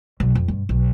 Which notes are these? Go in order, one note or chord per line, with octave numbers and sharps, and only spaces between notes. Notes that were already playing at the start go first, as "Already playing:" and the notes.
B1
F2
G2
B1